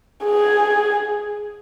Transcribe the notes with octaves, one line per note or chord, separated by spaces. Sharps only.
G#4